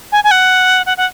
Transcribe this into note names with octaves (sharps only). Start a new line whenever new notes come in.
G#5
G#5
F#5
F#5
F#5